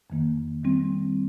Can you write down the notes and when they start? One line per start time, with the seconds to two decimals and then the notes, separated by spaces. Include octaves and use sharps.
0.10 F2 D#3 A#3
0.64 D#3 G3 C4